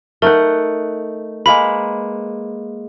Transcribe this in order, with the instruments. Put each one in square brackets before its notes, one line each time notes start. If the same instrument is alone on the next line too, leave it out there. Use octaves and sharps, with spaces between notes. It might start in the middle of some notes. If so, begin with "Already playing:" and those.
[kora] A3 D#4 F#5 [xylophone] A#4
[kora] G#3 A#3 B4 [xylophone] B5